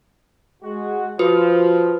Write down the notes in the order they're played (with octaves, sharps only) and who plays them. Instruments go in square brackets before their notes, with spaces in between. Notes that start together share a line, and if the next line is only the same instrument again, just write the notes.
[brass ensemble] G#3 F#4
[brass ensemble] F3 [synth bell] F#4 [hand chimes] B4